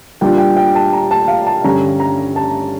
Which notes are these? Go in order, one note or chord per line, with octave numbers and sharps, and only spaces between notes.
A#2 G3 D4 F4 G5
G5
G5
A5
A#5
A5
F5
A5
G2 D3 G3 C#4 A#5
A#5
A5